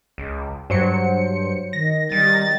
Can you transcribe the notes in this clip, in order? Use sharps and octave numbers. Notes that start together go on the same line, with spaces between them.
C#2
G2 F#3 C5 C#7
D#3 A#6
D#3 G3 A6